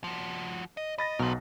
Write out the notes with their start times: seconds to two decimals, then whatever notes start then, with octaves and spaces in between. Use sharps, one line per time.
0.04 F3 F#4
0.77 D#5
0.98 D#5 B5 A6 A#6
1.19 B1 B2 A#4 C5